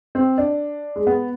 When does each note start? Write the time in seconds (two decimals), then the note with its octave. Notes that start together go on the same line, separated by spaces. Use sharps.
0.15 C4
0.38 D4
0.96 G#3
1.07 B3